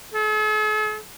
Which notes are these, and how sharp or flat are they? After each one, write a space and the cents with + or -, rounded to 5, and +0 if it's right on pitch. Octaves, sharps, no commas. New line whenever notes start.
A4 -45